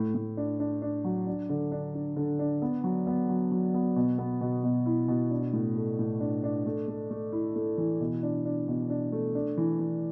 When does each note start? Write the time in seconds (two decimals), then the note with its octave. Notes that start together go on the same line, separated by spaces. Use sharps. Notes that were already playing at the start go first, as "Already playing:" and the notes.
Already playing: A2
0.14 A2
0.37 D4
0.60 D4
0.82 D4
1.04 F#3
1.27 D4
1.49 D3
1.72 D4
1.95 D4
2.17 D3
2.39 D4
2.62 B3
2.84 F#3
3.07 B3
3.29 F#3
3.51 F#3
3.74 B3
3.96 B2
4.18 B3
4.41 B2
4.64 B2
4.86 E4
5.08 B2
5.31 D4
5.53 A2
5.76 A3
5.99 A2
6.20 D4
6.43 D4
6.66 A3
6.88 A3
7.10 A3
7.32 E4
7.56 A3
7.78 E3
8.00 B2
8.23 D4
8.45 D4
8.68 B2
8.90 D4
9.12 A3
9.35 D4
9.57 E3
9.80 E3